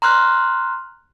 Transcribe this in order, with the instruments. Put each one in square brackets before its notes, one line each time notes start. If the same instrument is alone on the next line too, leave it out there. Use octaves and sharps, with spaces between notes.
[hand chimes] A#5 C6 F6 F#6